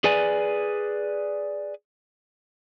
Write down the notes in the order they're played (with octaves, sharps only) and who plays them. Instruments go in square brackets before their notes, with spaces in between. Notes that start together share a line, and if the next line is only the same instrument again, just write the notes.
[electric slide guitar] G#4 B4 D5 G#5